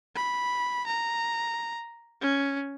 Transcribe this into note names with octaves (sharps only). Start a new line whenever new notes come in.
B5
A#5
C#4